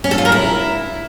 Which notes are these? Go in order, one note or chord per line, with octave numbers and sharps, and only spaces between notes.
C#4
A4
F4
A#4
E4